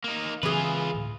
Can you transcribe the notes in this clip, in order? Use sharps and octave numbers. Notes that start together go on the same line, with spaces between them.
A#3 D#4
C#3 E3 F#3 C4 F4 G#4 B4
D2 A2